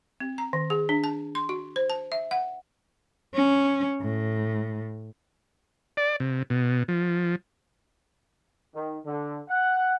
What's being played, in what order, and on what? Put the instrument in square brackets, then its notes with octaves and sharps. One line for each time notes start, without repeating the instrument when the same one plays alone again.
[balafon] C4
A#5
D#3
G#4
D4
A5
C6
F#4
C5
A5
E5
F#5
[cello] C#4
A2
[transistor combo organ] D5
C3
B2
F3
[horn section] D#3
D3
F#5